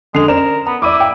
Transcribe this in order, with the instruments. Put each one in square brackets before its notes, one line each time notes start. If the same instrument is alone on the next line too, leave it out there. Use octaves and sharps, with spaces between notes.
[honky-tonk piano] D3 F7 [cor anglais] G#3 [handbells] C7
[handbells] C#4 C5 D5 [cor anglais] A#4 [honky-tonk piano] E7
[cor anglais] B3 [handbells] A#5
[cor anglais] E4 [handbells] D5 C#6 [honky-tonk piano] D6 D#7
[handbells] F5 [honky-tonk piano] G5